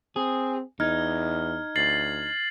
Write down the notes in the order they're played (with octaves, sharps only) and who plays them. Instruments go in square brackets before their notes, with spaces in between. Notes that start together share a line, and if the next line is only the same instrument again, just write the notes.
[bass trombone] C4 [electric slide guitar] G#4
[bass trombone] E2 [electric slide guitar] D#4 [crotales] F6 G#6
[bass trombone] D2 [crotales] A6 C7 F#7